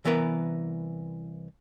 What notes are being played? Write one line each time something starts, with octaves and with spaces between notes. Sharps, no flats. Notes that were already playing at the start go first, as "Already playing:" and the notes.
C2 E3 B3 A#4 B4